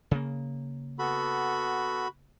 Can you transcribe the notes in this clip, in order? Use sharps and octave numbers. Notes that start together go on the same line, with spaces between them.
C#3 A#3
B3 F#4 A4 B5